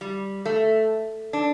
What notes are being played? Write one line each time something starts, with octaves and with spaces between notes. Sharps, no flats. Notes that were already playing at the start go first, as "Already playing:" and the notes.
G3
A3
D4